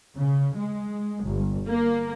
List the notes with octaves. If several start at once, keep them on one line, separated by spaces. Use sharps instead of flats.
C#3
G#3
G1
A#3